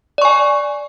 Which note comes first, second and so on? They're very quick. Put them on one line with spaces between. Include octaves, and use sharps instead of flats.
D5 C#6 G#5